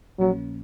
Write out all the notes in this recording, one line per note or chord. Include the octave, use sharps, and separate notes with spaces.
A#1 A#2 F3 F#3 A#3 C#4